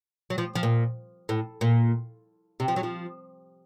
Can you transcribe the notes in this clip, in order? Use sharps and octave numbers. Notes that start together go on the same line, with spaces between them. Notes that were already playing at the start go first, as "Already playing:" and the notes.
F#3
F3
F3
A#2
A2
A#2
C3
F3
F#3
F3